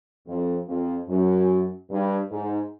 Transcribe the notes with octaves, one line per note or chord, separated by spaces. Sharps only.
F2
F2
F#2
G2
G#2